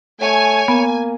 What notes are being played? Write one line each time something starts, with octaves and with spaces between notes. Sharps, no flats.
A3 C#5 G#5
A#3 B3